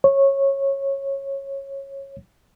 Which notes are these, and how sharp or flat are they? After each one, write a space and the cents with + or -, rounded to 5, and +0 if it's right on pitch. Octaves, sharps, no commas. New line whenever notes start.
C#5 -15